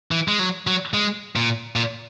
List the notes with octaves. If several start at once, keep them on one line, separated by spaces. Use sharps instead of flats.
E3
G#3
F#3
F#3
G#3
A#2
A#2